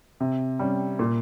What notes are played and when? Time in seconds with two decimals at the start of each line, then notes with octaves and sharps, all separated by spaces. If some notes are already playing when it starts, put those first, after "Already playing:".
0.20 C3
0.59 G3 C#4
0.99 A#2